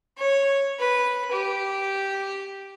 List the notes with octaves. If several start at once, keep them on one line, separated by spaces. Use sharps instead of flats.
C#5
B4
G4